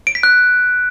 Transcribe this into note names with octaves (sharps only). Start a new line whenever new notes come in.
D7
B6
F#6